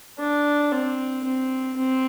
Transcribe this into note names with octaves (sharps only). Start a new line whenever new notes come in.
D4
C4
C4
C4